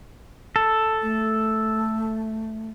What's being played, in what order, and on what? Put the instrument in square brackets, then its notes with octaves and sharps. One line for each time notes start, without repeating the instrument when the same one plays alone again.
[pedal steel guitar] A4
[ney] A3